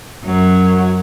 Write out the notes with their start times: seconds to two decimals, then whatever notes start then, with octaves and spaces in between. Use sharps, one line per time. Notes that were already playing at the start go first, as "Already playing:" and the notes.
0.25 F#2 F#3